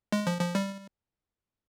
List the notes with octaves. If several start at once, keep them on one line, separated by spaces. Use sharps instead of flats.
G#3
F3
F3
G3